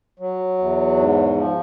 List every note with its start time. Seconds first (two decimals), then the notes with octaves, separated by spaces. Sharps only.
0.19 F#3
0.58 E2
0.97 G#2
1.36 F3